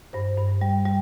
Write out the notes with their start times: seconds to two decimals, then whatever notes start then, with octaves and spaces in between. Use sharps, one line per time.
0.13 G2 C5
0.38 G2
0.61 G3
0.85 G3